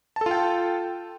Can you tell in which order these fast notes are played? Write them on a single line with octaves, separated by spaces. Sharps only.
A5 A4 F4 G5